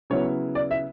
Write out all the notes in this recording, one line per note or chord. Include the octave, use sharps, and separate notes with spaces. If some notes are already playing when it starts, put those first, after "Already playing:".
C#3 F#3 B3 E4 C#5
D5
E5